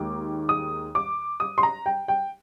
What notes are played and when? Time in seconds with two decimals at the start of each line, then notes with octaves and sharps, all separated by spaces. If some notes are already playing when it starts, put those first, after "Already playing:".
Already playing: D#2 D#3 G#3 D6
0.49 D#6
0.95 D6
1.40 D#6
1.58 C6
1.63 A#5
1.86 G5
2.08 G5